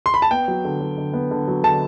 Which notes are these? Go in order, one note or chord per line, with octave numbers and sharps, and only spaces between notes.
C6
B5
A5
B3 G5
F#3
D3
F#3
D3
B3
D3
F#3
D3 A5